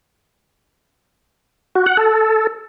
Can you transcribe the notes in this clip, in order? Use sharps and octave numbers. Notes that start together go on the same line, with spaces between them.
F#4
F#5
A4